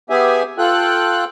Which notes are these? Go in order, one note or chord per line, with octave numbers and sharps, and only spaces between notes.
B3 G4 G#4 E5 G#5
F4 A4 G5 F#6